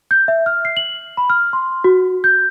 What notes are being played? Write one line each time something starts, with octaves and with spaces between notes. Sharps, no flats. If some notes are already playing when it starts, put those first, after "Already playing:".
G6
E5
F6
C7
F#7
B5
F6
C6
F#4
G6